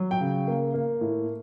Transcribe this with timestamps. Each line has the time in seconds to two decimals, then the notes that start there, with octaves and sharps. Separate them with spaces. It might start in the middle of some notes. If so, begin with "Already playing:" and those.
Already playing: F#3
0.11 G5
0.21 C#3
0.47 A#3
0.74 A#3
1.01 A2